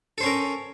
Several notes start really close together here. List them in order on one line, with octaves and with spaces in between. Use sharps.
A4 C5 C#4 A#4